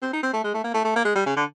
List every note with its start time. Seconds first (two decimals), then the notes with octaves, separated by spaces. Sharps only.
0.02 C4
0.13 D#4
0.23 C4
0.33 A3
0.44 G#3
0.54 A3
0.64 A#3
0.74 A3
0.84 A3
0.96 A#3
1.05 G#3
1.15 G3
1.26 C#3
1.36 D3